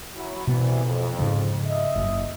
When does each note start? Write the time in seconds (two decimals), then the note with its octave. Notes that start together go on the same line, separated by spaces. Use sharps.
0.15 F#3 E4
0.47 C2 B2 E3 B3
0.84 F2
1.19 G#2 C#3 F3
1.66 D#5 E5
1.96 F#1